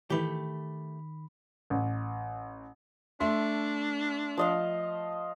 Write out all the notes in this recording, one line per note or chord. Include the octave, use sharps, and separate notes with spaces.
A2 D#3 E3 A3 G4 B5
A1
A3 D4 E5 C6
F3 D#5 F5